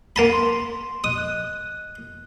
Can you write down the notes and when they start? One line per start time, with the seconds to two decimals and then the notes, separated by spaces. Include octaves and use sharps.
0.16 A#3 A5 B5 D#7
0.33 C6
1.04 D#5 D#6 F#6
1.18 F#6